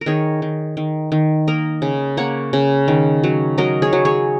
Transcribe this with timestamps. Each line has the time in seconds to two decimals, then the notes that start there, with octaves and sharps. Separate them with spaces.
0.01 A#4
0.06 D#3 G#4 C#5
0.42 D#3
0.77 D#3
1.12 D#3
1.48 A#3 A#4 D#5
1.82 C#3
2.17 A#3 C#5 F#5
2.53 C#3
2.88 D#3
3.24 F#3
3.58 F#3 A#4 D#5
3.82 G#4 C#5
3.93 F#3
4.05 G#4 C#5